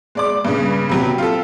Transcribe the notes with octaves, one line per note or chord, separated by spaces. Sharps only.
G#3 D5 D6
G2 C#3
C3 F#3 G4
F4 G4 A4